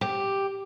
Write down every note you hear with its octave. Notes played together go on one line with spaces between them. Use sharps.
G4